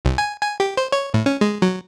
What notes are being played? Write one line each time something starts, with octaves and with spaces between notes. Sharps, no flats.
C2
G#5
G#5
G4
C5
C#5
A2
C#4
G#3
F#3